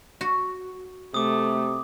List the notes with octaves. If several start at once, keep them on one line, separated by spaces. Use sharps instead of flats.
F#4
C3 A3 D6 D#6